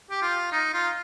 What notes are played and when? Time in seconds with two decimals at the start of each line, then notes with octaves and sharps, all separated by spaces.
0.10 G4
0.22 F4
0.52 D#4
0.73 F4